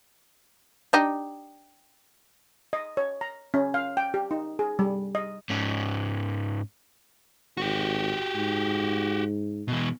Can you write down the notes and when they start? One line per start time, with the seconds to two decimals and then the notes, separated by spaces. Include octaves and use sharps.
0.93 D4 D#4 G4
2.73 D#5
2.97 C#5
3.21 A#5
3.54 C#4
3.74 F5
3.97 G5
4.14 G4
4.31 D#4
4.59 G#4
4.79 G3
5.15 D#5
5.50 G#2 C#4
7.57 G#1 F#4 G4
8.35 G#2
9.68 B2 E3